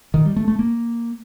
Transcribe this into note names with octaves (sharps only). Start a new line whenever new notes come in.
D#3
G3
A3
A3
A#3